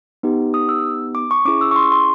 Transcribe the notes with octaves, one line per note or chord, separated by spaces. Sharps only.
B3 D#4 G4
D#6
E6
D6
C#6
C#4 E4 G#4 D6
E6
C#6
C6
C6